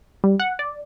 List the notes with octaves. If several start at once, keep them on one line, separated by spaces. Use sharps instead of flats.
G3
F#5
D5